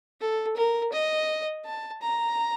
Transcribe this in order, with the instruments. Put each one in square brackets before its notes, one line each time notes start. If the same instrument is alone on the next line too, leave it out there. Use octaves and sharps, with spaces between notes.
[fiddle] A4
A#4
D#5
A5
A#5